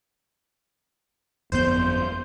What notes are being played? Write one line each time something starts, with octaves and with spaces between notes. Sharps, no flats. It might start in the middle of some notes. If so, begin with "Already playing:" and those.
G1 F2 B3 C5 G6